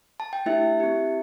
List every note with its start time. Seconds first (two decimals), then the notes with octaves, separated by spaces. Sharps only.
0.20 A5
0.33 G5
0.46 A3 D4 E4 G4 E5
0.80 C4 G4